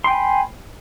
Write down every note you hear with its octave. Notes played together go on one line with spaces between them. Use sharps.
G5 G#5 B5 C6